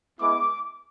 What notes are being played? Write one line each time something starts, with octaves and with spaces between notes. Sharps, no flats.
G#3 B3 E4 D6